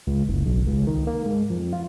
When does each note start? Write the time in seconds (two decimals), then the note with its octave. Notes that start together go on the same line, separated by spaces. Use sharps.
0.07 C#2
0.28 F#1
0.45 B1
0.67 C#2
0.87 D#3
1.07 A#3
1.26 G#2
1.50 F2
1.73 F4